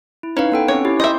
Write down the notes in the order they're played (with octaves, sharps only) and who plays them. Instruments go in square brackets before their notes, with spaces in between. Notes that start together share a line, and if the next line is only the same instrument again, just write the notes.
[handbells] E4
[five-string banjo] C#4 [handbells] D#4 B4 F5
[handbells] B3 A4 G5
[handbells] C4 C#4 [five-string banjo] C#5
[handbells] E4 G4
[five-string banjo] D#5 E5 [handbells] C6 G6